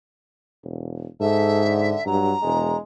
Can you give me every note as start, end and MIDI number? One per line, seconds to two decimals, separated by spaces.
0.64 1.06 28
1.20 1.94 44
1.20 1.61 69
1.20 2.04 76
1.65 2.01 50
2.06 2.33 43
2.06 2.33 54
2.06 2.77 82
2.43 2.74 28
2.43 2.79 56